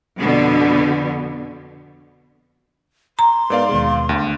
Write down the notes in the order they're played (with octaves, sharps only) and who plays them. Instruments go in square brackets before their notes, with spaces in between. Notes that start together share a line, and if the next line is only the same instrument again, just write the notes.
[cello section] F2 B2 D3 B3
[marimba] A#5 [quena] C6
[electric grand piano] G#2 D5 F5 [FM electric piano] B3 A#4 B4
[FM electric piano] D#2 B2 G#3
[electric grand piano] D2